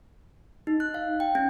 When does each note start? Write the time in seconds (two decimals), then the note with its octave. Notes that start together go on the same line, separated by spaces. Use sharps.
0.67 D#4
0.80 F#6
0.94 F5
1.20 G5
1.35 C#4